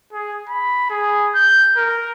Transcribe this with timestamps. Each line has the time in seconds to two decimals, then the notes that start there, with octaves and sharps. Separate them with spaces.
0.13 G#4
0.49 B5
0.90 G#4
1.35 G6
1.77 A#4